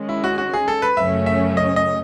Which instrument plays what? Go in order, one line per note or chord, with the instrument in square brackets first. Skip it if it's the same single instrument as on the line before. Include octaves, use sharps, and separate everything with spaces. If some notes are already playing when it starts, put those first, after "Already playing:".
Already playing: [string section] D#3 G#3 C#4
[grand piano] E4
F#4
F#4
G#4
A4
B4
[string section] F#2 C#3 F#3 A3 C#4 [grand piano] E5
[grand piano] E5
D#5
D#5